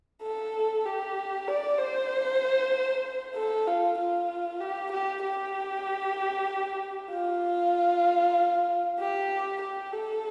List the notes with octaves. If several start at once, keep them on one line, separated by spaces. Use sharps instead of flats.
A4
G4
D5
C5
A4
F4
F4
G4
G4
G4
F4
G4
G4
A4